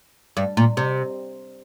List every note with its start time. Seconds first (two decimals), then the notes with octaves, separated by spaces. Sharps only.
0.37 G2
0.57 A#2
0.77 C3